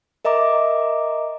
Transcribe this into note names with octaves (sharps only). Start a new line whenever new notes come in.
A#4 D#5 E5 A#5 D6